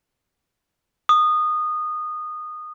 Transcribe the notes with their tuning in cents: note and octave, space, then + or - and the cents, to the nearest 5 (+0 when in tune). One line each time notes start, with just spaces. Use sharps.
D#6 -20